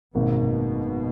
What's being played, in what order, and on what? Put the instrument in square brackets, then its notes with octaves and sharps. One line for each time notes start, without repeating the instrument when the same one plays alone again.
[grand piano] G#1 F#2 D#3 A#3 [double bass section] B2